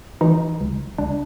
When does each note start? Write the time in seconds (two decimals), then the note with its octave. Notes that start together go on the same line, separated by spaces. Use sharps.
0.21 E3 D#4
0.61 C#2
0.98 C#2 D4